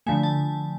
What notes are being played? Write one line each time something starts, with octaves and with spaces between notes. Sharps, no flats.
D3 F3 A3 G#5
A5